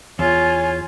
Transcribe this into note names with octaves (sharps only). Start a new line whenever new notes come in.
E2 F4 C#5 G#5